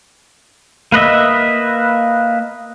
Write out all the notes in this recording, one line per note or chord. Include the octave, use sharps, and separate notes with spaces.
A#3 B4 D#5 E5